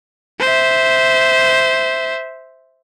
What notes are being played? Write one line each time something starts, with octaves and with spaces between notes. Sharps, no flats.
C5 E5